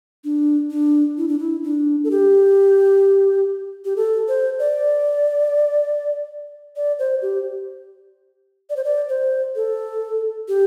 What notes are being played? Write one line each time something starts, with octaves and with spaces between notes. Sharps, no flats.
D4
D4
E4
D4
E4
D4
A4
G4
G4
A4
C5
D5
D5
C5
G4
D5
C5
D5
C5
A4
G4